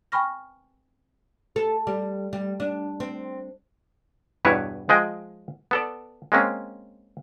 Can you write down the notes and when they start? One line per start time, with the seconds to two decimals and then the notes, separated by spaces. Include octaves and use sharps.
0.12 G5 G#5 B5 C#6 F6 A#6
1.56 A4
1.87 G3
2.33 G3
2.60 D4
3.00 C4
4.45 E2 G2 B2 E4 B4 C#5
4.89 F3 G#3 G#4 D#5 G5
5.71 B3 A4 D5
6.32 G#3 A#3 C4 C#4